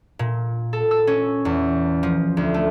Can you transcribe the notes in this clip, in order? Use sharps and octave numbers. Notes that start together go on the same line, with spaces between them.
A#2
A4
E6
C#4
E2
F3
D2
A3